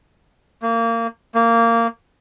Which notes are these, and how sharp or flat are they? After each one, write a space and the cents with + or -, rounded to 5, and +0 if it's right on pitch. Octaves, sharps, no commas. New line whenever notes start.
A#3 -25
A#3 -15